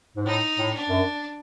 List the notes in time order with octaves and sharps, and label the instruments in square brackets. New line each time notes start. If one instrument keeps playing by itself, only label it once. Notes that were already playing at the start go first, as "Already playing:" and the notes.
[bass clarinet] G#2
[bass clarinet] A2 [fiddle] D#4
[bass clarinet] A2
[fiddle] D4
[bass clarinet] F#2